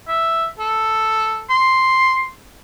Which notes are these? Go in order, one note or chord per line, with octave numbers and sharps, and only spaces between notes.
E5
A4
C6